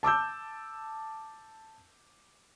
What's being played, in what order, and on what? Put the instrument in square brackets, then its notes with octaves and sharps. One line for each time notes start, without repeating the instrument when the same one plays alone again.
[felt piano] A5 D6 E6 G6